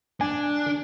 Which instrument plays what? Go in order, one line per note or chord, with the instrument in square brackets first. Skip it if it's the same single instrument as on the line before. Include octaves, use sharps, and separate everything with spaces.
[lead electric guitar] D4 [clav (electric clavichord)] G#5